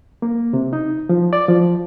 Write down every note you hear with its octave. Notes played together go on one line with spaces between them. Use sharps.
A#3
C3
D#4
F3
D5
F3